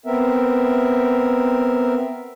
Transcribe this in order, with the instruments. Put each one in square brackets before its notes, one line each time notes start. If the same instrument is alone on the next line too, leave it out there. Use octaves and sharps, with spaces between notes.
[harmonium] B3 C4 A#4 E5